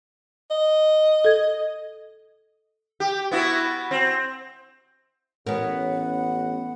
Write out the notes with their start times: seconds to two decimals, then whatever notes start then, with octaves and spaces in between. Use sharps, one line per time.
0.51 D#5
1.25 A4 G#6
3.00 G4
3.31 B3 E4 F#4
3.91 C4
5.47 A1 B3 C#4 A#4 F#5